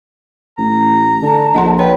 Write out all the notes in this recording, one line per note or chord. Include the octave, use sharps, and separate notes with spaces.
A1 A#5
D3 A5
A#1 D#5 F#5 C6
B4 C#5 G5